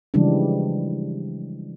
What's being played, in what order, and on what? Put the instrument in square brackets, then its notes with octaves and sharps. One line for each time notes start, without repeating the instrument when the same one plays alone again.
[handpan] C#3 E3 F3 G3 G#3 D4